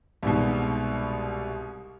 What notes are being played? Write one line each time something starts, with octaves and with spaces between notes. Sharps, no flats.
C2 G#2 B2